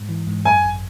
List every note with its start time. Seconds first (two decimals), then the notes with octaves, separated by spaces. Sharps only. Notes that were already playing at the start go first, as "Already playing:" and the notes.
Already playing: G#2
0.09 E3
0.27 G#2
0.45 F#2 G#5
0.64 G#1